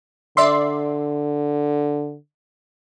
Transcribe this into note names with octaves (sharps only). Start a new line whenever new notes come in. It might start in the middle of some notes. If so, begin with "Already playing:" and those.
D3 D5 E5 C6